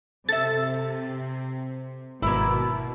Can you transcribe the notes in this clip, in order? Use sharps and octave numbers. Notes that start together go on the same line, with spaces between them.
C3 A4 E5 A6
G#1 B2 A#3 E4